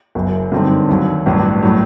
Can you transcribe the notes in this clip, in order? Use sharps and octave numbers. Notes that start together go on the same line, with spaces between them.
F#1 F#2 F#3
G2 D3 F#3 C4 D#4
D#2 D#3 F#3
A1 G2 F#3
A2 F#3